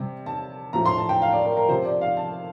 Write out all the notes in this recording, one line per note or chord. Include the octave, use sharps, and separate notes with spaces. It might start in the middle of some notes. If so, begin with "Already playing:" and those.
Already playing: C3 G3
A5
A2 F3 A#5
C6
A5
G5
F5
D5
A#4
A#4
C3 F3 C5
D5
F5
A5